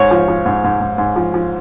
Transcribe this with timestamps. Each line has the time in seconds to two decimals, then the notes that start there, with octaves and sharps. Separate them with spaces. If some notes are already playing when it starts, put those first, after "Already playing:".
Already playing: G#2 C#5
0.11 F3
0.28 F3
0.46 G#2
0.64 G#2
0.81 G#2
0.98 G#2
1.16 F3
1.34 F3